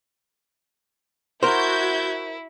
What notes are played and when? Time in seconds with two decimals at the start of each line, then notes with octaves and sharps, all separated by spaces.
1.43 E4 F#4 A#4 C5 G6 G#6